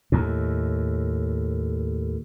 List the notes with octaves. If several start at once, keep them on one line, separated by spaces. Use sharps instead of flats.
D#2 A2